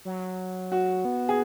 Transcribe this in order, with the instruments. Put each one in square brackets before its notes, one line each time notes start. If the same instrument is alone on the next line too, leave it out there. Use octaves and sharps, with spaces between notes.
[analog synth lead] F#3
[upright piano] F#4
[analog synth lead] B3
[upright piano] G#4